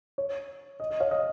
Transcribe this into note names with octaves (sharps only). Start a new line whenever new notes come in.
C#5
D#5
D#5
C#5 F5
D#5